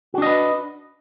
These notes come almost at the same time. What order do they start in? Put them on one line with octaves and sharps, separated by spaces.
F#4 D4 D#5 B4